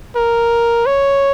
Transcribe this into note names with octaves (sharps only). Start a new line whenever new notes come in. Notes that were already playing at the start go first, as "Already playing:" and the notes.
A#4
C#5